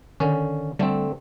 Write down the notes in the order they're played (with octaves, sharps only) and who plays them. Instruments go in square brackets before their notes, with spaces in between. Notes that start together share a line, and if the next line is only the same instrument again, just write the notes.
[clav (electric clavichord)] D3 C#4 [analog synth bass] D#3
[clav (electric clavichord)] D3 A3 C4 [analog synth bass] G3